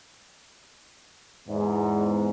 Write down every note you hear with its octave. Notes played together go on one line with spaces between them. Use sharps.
E2 G#2